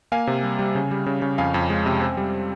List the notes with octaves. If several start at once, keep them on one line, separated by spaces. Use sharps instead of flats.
A#3 F5 G#5
C3
G3
G3
C#3
G3
C#3
C#3
F2 F5 G#5
F2
G#3
C3
C4
G3